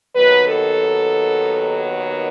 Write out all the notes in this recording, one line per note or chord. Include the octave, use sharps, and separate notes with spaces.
D#2 D#3 F#3 B3 B4
A4